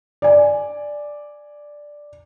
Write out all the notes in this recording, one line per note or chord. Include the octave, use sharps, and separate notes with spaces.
D5 G#5